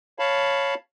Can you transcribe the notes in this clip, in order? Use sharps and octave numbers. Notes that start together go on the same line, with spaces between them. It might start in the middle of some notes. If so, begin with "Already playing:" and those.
C#5 F5 A5 B5